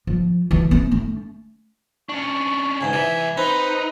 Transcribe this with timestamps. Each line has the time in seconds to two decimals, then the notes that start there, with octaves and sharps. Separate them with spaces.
0.07 F3
0.51 D2 E3
0.71 C4
0.92 A3 C#4
2.09 C#4 D4 C#6
2.81 E2 G#2 C#3 G#5
2.93 C2 E3 E5
3.37 C4 D#4 B4